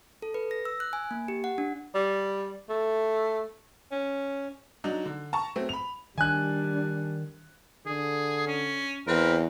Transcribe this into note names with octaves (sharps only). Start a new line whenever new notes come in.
A4
B4
A#6
E6
F#6
G#5
A#3
G4
F#5
D4
G3
A3
C#4
F#3 D4 D#4
D3
A5 A#5 C#6
F#3 A3 C4
B5 F7
D#3 G3 D4 G#5 F#6
D3 G#4
C#4
E2 C4 A#4 B4